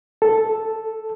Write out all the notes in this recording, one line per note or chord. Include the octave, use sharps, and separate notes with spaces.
A4